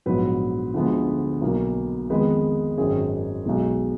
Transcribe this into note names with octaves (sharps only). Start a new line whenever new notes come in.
A#1 G#2 F#3 B3 B4
D2 D3 F3 G#3 B3
B1 B2 A#3
F2 D#3 G#3 B3 B4
G#1 F#2 D#3 G#4
B1 B2 G#3